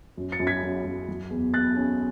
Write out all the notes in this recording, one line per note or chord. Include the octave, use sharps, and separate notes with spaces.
F#2
A6 C#7
F#2
G#6 B6
F#2
F#2
F#3
E2
E2 F#6 A6
C#4